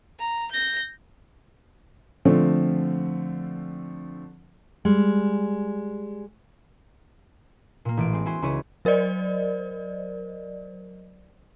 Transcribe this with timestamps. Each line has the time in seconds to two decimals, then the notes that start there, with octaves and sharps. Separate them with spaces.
0.19 A#5
0.51 G6 A#6
2.25 D3 F3 A3 C4
4.85 G3 G#3
7.85 A#2 A#3
7.97 A1 E3 D7
8.13 G#3 C4
8.26 E4 F#4 G#5 C6
8.42 C#2 E4 C#5 D#7
8.85 F#3 A#4 C5 D5 D#5